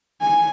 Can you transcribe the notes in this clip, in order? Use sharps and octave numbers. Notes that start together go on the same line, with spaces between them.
G#5